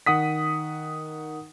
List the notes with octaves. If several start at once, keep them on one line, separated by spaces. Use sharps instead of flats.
D#3 F#5 D#6 B6